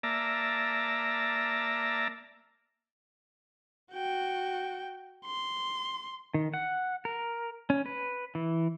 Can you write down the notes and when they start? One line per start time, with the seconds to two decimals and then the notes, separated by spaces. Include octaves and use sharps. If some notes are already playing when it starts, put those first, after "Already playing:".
0.03 A#3 D5 E5 A5 A#5
3.93 F#4 G5
5.26 C6
6.34 D#3
6.54 F#5
7.05 A#4
7.70 C#4
7.86 B4
8.35 E3